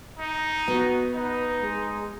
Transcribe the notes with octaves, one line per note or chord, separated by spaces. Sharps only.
D#4
B3 F#4
D#4 B4
G#3